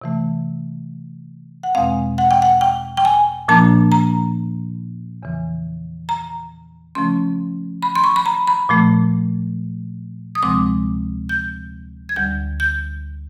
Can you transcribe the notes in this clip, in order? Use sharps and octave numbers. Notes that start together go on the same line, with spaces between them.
C3 E3 A3
F#5
E2 B2 G#3 C4 F5
F#5
G5
F#5
G5
G5
G#5
A#2 F3 A#3 D4 A5
A#5
E2 C#3 E3
A#5
C#3 F3 A3 C#4 C6
B5
C6
C#6
B5
A#5
B5
A#2 F3 A3
D#6
D2 C3 F3 G#3 C4 D6
G6
G#6
D2 D3 G3 G6
G6